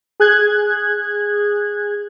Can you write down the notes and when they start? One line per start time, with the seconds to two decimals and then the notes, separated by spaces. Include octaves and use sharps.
0.20 G#4 F#6 G#6